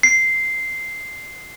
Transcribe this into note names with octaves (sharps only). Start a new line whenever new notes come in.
C7